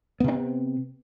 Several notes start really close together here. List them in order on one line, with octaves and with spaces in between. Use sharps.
B3 C3 D4 C4